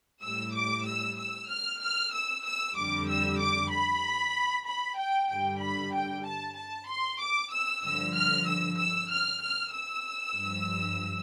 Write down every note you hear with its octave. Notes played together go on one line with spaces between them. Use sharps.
A2 G3 E6
D6
E6
E6
F6
F6
E6
E6
F2 D3 G3 D6
E6
D6
B5
B5
G5
G2 D3 G3 G5
B5
G5
A5
A5
C6
D6
E6
G2 D3 F3 E6
F6
E6
E6
F6
F6
E6
G2 F3